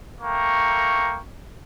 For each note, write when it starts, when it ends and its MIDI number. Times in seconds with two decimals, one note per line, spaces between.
0.21 1.19 57
0.21 1.19 58
0.21 1.19 79
0.21 1.19 82
0.21 1.19 85